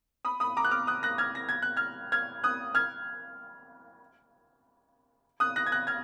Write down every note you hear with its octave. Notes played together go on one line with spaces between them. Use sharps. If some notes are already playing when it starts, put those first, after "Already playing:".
B5 D#6
B5 D#6
A#5 D6
F#6
D6 F6
D#6 F#6
F#6 A#6
F6 G#6
A#6
G#6
F#6
F6 G#6
F6 G#6
D#6 F#6
F6 G#6
D#6 F#6
F#6 A#6
G#6
F#6 A#6
F6 G#6